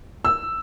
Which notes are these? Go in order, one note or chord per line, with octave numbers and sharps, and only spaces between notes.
E6